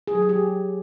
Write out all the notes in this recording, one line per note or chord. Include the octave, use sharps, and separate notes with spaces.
G#4
F#3
G#4
G4